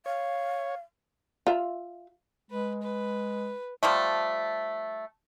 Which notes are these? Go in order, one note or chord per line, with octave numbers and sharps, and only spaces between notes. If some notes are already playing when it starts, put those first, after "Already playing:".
C#5 F5
F4 E5
G#3 B4
B4
F3 G3 A3